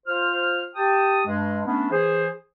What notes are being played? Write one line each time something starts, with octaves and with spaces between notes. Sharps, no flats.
F4 C5 F6
G4 G5 A5 D#6
G2 G#3
A3 B3 C#4 D4
E3 G#4 C5